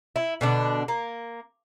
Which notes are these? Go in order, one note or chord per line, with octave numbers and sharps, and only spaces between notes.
E4
B2 D3 D4
A#3